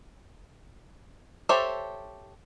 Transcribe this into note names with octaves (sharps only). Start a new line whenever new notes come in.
G4 A4 C5 C#5 E5